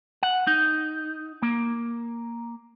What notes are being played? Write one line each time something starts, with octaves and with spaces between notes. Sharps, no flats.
F#5
D#4
A#3